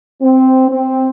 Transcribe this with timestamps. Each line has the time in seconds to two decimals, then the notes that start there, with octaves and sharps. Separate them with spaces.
0.21 C4
0.69 C4